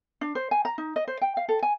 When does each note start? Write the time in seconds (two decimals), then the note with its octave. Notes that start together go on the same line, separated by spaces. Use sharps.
0.21 D4
0.35 C5
0.51 G#5
0.65 A#5
0.78 D#4
0.96 D#5
1.08 C5
1.21 G5
1.37 F5
1.49 A4
1.63 G#5